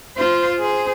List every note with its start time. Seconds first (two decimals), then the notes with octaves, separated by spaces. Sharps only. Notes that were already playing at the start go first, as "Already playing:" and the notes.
0.17 F4 C5
0.59 G#4 C5